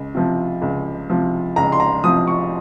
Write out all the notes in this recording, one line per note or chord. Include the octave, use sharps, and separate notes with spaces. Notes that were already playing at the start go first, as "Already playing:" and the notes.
Already playing: C#2
C3 F3
C#2
C3 F3
C#2 A#5
C6
A#5
C3 F3 D#6
C#6